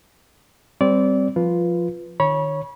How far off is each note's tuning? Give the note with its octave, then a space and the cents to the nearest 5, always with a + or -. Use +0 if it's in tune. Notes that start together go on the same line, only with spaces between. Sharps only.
G3 +0 C4 +0 D5 -25
F3 +0 F4 -5 B4 +0
D#3 -30 C#5 +0 B5 -35